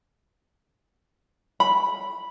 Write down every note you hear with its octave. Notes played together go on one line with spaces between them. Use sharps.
B5